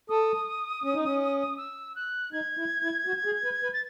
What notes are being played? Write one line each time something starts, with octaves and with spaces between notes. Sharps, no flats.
A4 D#6
C#4
D#4
C#4
E6
F#6
D#4 G#6
E4
E4
F#4
G#4
B4
B4
A6